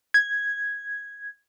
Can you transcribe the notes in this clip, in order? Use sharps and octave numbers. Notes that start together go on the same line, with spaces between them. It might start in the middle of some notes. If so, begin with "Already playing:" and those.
G#6